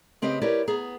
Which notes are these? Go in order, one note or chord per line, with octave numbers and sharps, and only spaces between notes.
C#3 C4 G4 B4 D#5
E4 G4 A#4 B4 C#5 D5
B3 G#4 A#5